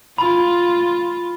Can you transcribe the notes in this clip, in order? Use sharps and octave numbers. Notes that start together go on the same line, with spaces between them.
F4 B5